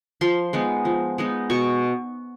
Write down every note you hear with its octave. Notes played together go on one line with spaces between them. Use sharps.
F3 C6
G#3 B3 D#4
F3
G#3 B3 D#4
B2 C#6